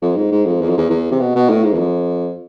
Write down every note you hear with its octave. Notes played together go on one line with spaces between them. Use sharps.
F2
G#2
G#2
F2
E2
F2
E2
E2
C3
B2
B2
A2
G#2
E2
F2